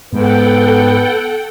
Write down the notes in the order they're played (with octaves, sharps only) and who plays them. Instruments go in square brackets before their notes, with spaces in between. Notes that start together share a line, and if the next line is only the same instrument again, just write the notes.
[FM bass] G#2 [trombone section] B3 [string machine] A4 F#5 G5